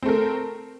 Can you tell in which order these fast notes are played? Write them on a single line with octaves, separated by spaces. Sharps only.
C4 A3 A#4